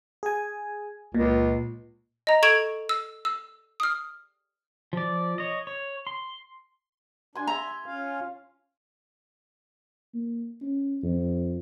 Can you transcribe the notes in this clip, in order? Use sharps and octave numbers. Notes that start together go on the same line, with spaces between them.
G#4 G#5
C#2 A#2
D#5 A#5
A4 C#6 G#6 D7 E7 F7
E6
E6
D#6 F6
F3 D5
C#5 D#5
C#5
C6
D4 G#5 C6
E5 A#5
C#4 F4 F5
A#3
C#4
F2